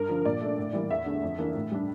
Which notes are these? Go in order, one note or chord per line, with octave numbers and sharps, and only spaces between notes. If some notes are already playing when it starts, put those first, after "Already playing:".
Already playing: G2 A#4
D3 F3
A#2 D5
A3 D4
A2
E3 G3 A#3
E2 E5
D3 A3
F2
E3 A#3 D4
A2
G3 D4